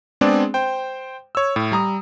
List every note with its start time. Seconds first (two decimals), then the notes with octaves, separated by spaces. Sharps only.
0.21 G#3 B3 C4 D4 G#4 D5
0.54 C5 G5
1.35 C#5 E6
1.56 A2
1.72 G3 A#5 D#6